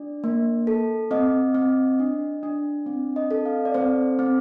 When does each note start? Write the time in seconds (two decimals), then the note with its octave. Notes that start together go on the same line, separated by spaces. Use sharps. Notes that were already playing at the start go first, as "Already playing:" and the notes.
Already playing: D4 D5
0.24 A#3
0.67 A4
1.11 C4 D#5
1.55 C4
1.99 D4
2.43 D4
2.86 C4
3.16 D#5
3.31 A4
3.46 F5
3.65 D5
3.74 C4 C5
4.19 C4